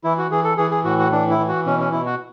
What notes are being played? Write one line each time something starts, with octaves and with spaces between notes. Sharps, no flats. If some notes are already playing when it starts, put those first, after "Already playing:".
E3 E4
F#4
E3 G#4
A4
E3 G#4
G#4
A2 F#4
F#4
E3 D4
E4
E3
F#4
B2 C#4
C#4
B2 E4
F#4